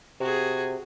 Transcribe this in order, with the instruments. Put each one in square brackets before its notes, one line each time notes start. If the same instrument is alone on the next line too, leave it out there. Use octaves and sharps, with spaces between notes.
[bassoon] C3 [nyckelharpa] F#4 G#4